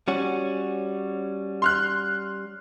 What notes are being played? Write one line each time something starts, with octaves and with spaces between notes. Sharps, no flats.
G3 C#4 F#4
C6 F6 F#6